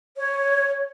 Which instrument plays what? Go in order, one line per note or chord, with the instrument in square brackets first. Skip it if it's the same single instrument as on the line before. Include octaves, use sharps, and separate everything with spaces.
[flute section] C#5